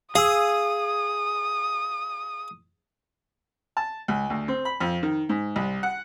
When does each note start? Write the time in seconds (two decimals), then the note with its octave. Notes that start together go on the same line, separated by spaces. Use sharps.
0.15 G#4 F5 G#5 D#6 E6
3.77 A5
4.08 C#2
4.30 D2
4.48 C4
4.65 B5
4.80 F2
5.03 D#3
5.29 G#2
5.56 C2
5.83 F#5